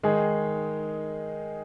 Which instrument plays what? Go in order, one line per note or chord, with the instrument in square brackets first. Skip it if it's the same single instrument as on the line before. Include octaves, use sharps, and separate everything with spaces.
[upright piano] D#3 G#3 D#4 G#4